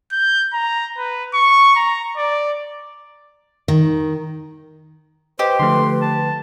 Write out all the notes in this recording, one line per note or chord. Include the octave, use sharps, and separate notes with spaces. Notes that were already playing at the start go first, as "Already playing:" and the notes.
G6
A#5
B4
C#6
A#5
D5
D#3
G4 B4 C5 D#5
D3 F3 A3 C6
A5